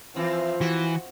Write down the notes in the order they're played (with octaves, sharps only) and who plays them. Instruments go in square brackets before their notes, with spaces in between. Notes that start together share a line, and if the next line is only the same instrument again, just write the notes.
[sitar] E3 C4 [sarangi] F3
[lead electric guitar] E3 [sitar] F#4